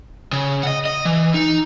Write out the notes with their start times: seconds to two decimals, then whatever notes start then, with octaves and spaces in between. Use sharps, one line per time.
0.33 C#3
0.63 D#5 F#5
0.85 D#5
1.05 E3
1.34 D#4